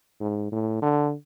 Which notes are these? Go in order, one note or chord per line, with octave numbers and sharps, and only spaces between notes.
G#2
A2
D3